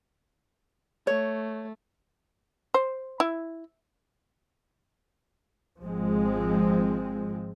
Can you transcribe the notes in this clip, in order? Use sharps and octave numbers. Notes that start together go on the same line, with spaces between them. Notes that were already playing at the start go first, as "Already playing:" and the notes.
A3 C#5
C5
E4
G#1 F3 G#3 C4